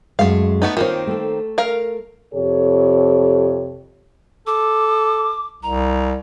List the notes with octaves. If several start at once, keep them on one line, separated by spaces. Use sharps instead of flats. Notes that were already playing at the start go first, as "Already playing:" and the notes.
F#2 G#3 A3 F5
A3 B3 D#4
D#3 A#3 C4 F4 C#5
A3 A4
A#4 F5
F2 C3 G4 A4 C#5
A4 D6
C2 A#5